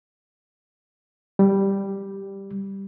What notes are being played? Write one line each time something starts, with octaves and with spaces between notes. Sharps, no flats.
G3